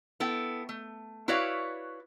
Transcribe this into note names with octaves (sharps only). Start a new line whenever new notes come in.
B3 E4 A4 G5
A3
E4 F#4 B4 C#5 D5 F5